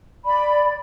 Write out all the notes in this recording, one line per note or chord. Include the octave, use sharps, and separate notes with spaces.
D5 B5